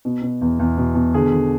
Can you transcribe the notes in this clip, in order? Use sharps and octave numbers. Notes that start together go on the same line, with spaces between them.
B2
B2
E2
E2
B2
B2
D3 G#4
D3